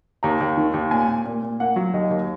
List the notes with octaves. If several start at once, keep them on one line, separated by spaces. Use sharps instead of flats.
D#2 A#5
D#2
D#3
D#2
A#2 G#5
A#2
A#2
A#2
A#3 F#5
F#3
D#2 D#5
D#2